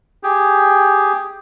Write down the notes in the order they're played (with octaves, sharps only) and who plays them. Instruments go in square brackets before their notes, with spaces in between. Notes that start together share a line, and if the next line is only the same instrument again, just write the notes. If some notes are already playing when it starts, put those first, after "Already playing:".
[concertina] G4 G#4